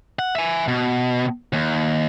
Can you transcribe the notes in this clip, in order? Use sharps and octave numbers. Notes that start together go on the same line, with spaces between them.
F#5
E5 G#5
B2
D#2